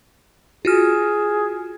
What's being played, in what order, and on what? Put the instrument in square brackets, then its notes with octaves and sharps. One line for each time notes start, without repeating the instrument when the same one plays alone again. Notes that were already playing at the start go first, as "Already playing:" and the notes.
[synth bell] F4 F#4 F6 [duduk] G#4